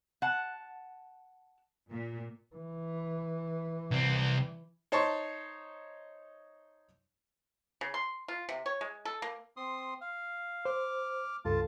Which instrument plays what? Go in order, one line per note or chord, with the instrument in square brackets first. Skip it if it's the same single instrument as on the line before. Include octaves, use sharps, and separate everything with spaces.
[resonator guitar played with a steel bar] F#5 A5
[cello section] A#2
[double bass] E3
[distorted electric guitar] C2 C4
[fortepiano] D#4 C5 C#5 A5 C6 C#6
[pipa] C#3
C6
F4
C3
C#5
G#3
A4
A#3
[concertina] C4 C6 D#6
F5
[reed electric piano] C5 [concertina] D6 F6
[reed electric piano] C#2 G2 A4 [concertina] F4 A5